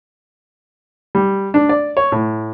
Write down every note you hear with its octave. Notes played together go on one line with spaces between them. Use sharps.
G3
D4
D5
C#5
A2